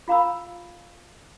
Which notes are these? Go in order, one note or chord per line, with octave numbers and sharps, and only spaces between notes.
F4 F5 A#5 B5 E6